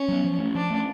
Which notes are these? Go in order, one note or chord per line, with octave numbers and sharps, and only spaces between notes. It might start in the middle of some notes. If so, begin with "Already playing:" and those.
Already playing: C#4
F#3 B3
F3
A3 C#4
F3 D4
A3 C#4